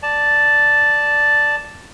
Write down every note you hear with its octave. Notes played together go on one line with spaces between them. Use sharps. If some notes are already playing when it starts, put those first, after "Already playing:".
D5 A5